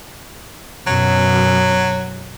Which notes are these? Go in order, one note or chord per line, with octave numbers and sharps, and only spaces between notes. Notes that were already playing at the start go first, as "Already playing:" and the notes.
F#2 B2 F#3